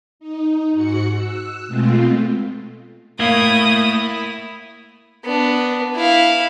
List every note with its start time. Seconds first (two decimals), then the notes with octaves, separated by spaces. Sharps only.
0.20 D#4
0.72 G#2 F#4 F#5 C#7
1.16 E6 F#6
1.67 B2 G#3 A3 C4 F4
3.20 A3 A#3 E4 C#5 D#6
5.24 B3 D4
5.96 E4 F5